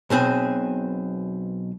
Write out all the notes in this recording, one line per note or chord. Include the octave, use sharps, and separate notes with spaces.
B1 B2 C4 G#4